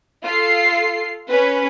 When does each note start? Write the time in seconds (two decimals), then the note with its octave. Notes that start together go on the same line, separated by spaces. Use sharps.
0.24 F4 A4 C7
1.29 C#4 B4